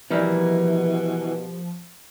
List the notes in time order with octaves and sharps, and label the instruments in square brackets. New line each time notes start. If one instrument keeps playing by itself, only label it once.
[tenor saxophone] B2 [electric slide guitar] E3 [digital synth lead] F3 [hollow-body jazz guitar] G3 A#3 D#4